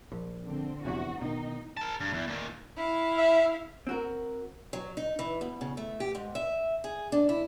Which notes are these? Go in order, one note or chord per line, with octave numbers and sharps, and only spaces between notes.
A#1
D3 C4
F1 E2 C3 F#4
B2 D#3 D#4
A#4 A5
G2
E2
A#2 D#3
E4 F5
E5
C4 F#4 A#4
F#3
D#4
E3
B2
C#3
A3
G4
G#2
E5
G#4
D4
E4